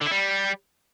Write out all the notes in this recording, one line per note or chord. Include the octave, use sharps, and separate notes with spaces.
D3
E4
G3